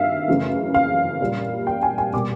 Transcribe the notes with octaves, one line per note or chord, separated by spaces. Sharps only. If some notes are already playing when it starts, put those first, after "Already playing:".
Already playing: G2 D#3 E5 F5
F#2 C#3 E3 A3
F5
A#2 G3 A#3
G5
G#5
G#5
B2 G3 A#3 D6